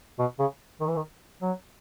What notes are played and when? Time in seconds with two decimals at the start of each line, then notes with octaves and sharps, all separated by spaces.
0.19 B2
0.39 C#3
0.80 D#3
0.87 E3
0.96 D#3
1.42 F#3